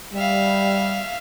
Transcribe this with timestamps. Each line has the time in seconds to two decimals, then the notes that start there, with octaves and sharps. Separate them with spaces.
0.14 G3 E5 F5